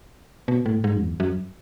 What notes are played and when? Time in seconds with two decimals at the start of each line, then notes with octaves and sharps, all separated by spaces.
0.48 B2
0.66 A2
0.84 G#2
0.96 F#2
1.02 E2
1.20 F#2